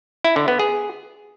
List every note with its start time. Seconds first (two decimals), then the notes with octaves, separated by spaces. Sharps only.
0.24 E4
0.36 D3
0.48 B3
0.59 G#4